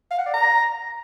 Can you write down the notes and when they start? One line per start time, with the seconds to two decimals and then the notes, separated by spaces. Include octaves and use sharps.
0.11 F5
0.18 F#5
0.26 D5
0.33 A#5